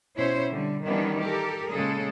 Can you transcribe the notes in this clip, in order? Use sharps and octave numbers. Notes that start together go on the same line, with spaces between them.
B2 C#4 E4 C5 C#5
D3 G3
D#3 E3 G3 B3 C#4 D4
G4 A4 A#4
A#2 C#3 G#3 G#4 A4